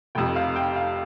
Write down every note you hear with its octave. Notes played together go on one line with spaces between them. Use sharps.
F1 F2 C3 G5
F5
G5
F5